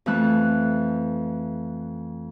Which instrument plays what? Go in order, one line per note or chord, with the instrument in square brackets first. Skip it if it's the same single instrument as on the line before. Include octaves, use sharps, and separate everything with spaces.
[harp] F2 E3 A3 E6 F#6